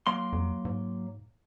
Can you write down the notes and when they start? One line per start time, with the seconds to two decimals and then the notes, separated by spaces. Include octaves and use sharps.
0.07 F#3 A#3 C6
0.33 F2
0.65 G#2